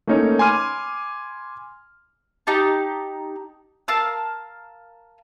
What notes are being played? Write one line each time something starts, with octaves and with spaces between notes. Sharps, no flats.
A3 A#3 C#4 D#4 A#4 C#5
G#5 B5 C6 D6 F6 D#7
D#4 G4 A5
A#4 F5 A5 E6